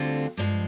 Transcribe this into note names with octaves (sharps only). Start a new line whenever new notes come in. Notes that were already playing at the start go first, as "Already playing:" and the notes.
Already playing: D2 D3 G3 C4 F4
G2 F3 G#3